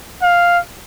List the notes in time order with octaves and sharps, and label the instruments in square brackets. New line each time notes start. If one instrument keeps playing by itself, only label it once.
[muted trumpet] F5